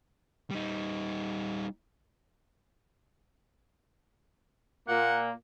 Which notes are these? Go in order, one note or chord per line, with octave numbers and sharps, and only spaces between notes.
G3 D#4
A#2 A#3 F#5